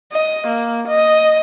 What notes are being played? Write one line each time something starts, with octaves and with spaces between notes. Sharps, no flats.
D#5
A#3
D#5